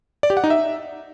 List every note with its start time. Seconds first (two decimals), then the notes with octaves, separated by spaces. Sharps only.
0.23 D5
0.30 G4
0.37 F#5
0.44 D#4
0.50 E5